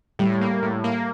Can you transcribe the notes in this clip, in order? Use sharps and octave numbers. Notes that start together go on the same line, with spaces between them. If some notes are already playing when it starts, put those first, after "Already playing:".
A2 G3
A#3
A2
A#3